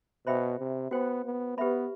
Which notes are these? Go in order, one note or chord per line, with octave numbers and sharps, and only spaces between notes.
B2 C5 E5 G5 B5
C3
B3 F#4 C5 G5
B3
B3 G4 B4 E5 B5